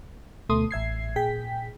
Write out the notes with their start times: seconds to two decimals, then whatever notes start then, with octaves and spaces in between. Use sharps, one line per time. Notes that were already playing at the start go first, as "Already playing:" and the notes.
0.49 D2 B2 A3 C6 D#6
0.71 A1 E5 G#6 C7
1.16 A#2 G#4 G5 B6